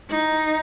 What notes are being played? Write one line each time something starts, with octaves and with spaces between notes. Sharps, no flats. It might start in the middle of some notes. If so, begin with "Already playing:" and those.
D#4